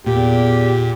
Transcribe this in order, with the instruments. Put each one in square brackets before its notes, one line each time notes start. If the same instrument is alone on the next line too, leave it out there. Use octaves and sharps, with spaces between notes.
[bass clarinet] E2 [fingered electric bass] A#2 [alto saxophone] G4